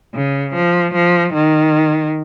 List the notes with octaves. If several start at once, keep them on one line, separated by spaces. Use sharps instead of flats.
C#3
F3
F3
D#3